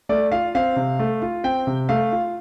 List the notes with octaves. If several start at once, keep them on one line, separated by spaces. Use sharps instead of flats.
A3 D5
F4 F5
C4 F5
C3
A3
F4
C4 G5
C3
A3 F5
F4